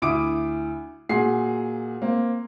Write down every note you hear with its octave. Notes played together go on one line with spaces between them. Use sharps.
D2 E4 D6 D#6 D7
A#2 F#4 G#4 C7
A#3 C4